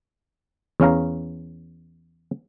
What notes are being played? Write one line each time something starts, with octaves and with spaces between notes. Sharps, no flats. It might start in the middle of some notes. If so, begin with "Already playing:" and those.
E2 C#4 F5 A#5